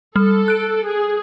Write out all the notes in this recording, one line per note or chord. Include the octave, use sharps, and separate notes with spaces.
G3 A4
F#6 D7
G#4